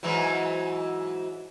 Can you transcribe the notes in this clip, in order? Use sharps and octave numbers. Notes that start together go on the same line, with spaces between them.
G#2 E3 F#3